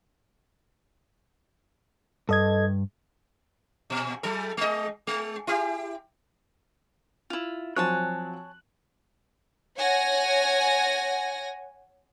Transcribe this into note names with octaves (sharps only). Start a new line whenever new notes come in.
G2 A4 D#5 G#6
A#2
F#3 A4
G#3 D#5
G#3
E4 G4
E4 F4
F3 F#3 C4 C#5 G#5 A5 F#6
C#5 F#5 G#5 A#6